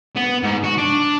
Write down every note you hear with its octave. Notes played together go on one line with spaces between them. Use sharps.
B3
G#2
F#4
D4